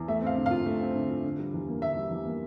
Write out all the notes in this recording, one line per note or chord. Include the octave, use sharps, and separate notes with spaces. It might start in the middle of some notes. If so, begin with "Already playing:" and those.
Already playing: E2
A3 E5
C4 F5
D3
F4 F5
A3
C4
D3
F4
D3
G3
E2
A#3
D3 E5
G3
E2
A#3